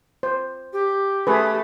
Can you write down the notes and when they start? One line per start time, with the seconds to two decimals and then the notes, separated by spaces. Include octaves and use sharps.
0.23 C5
0.73 G4
1.27 A3 G#4 B4